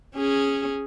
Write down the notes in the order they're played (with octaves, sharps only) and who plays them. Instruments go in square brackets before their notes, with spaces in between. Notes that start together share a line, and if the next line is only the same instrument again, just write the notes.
[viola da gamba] C#4 G#4